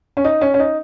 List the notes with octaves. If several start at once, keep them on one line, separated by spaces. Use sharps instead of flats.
C#4
D#4
C#4
C#4
D#4